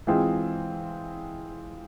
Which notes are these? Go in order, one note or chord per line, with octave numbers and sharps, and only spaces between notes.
E3 G#3 C4 F4 G#4